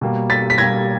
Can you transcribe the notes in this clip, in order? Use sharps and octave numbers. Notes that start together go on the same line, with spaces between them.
B2 G3 A#3
A6 B6
B6
B2 G3 A#3 G#6 A#6